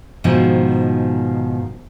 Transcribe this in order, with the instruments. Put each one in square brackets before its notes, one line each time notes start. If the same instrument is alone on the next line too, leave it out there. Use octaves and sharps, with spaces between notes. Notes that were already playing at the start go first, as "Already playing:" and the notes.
[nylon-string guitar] G#2 B2 D#3 F3 D#4